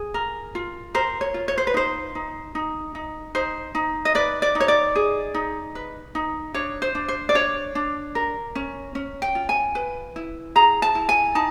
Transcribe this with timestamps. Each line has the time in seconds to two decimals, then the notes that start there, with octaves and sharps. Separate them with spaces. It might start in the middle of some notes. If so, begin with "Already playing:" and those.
Already playing: G#4
0.14 A#4
0.55 F4
0.94 A#4 C5
1.21 C#5
1.34 F4
1.48 C#5
1.58 C5
1.67 B4
1.74 D#4 C5
2.15 D#4
2.55 D#4
2.95 D#4
3.35 D#4 C5
3.75 D#4
4.05 D#5
4.15 B4 D5
4.42 D5
4.55 D#4
4.60 C#5
4.68 D5
4.95 G#4
5.34 D#4
5.75 B4
6.15 D#4
6.54 D4 C#5
6.82 C5
6.95 D4
7.08 C5
7.29 D5
7.35 D4 C#5
7.75 D4
8.15 A#4
8.55 C#4
8.95 C#4
9.22 G5
9.35 F4
9.49 G#5
9.75 B4
10.16 E4
10.55 G#4 A#5
10.82 A5
10.95 E4
11.09 G#5
11.35 D#4 A5